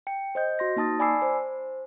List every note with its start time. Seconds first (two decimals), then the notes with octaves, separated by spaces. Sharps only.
0.07 G5 C#7
0.35 C5 D#5 G6
0.59 F#4 C6 A#6
0.76 A#3 D#4 A5 D#6 A6
0.99 D5 G#5 B5 D6 E6 C7
1.22 C5